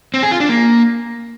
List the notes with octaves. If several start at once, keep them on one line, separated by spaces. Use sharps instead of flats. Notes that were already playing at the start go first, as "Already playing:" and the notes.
C4
G#4
F4
D4
A#3